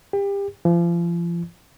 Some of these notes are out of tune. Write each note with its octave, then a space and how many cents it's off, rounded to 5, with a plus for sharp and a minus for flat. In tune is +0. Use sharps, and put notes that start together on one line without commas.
G4 +30
F3 -35